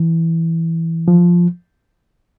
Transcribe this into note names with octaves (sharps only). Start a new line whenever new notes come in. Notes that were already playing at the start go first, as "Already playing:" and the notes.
Already playing: E3
F3